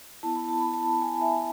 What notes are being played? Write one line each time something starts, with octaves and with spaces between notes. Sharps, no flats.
B3 E4 A5
B5
A5
B5
A5
G#5
E5